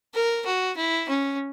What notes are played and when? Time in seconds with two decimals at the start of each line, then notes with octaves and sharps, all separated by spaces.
0.14 A#4
0.46 F#4
0.77 E4
1.09 C#4